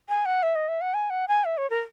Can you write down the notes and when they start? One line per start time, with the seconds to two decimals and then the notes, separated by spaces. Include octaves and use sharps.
0.09 G#5
0.25 F#5
0.43 E5
0.55 D#5
0.68 E5
0.81 F#5
0.94 G#5
1.10 F#5
1.28 G#5
1.45 E5
1.57 C#5
1.70 A#4